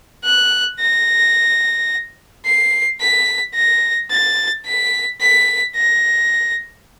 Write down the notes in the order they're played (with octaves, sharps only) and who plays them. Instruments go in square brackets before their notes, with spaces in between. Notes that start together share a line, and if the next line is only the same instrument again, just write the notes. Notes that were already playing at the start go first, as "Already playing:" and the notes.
[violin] F#6
A#6
C7
B6
A#6
A6
B6
B6
A#6